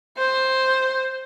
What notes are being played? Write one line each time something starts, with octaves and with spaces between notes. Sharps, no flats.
C5